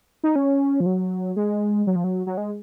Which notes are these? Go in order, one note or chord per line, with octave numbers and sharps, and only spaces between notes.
D#4
C#4
F3
F#3
G#3
F#3
F3
F#3
F#3
G#3